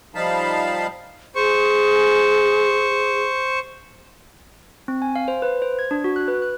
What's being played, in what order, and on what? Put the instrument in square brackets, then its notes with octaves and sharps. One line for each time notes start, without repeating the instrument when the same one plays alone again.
[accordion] F3 G3 D#4 F5 A5 B5
[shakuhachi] G#4 [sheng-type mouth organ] C5 C#6
[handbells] C4
G#5
F5
C5
B4
C5
G#6
D4
F#4
F#6
B4
F#6